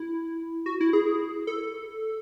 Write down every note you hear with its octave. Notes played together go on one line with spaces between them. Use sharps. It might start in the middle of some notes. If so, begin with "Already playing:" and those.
Already playing: E4
F#4
E4
G#4
A4